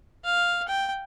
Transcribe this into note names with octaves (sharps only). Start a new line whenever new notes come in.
F5
G5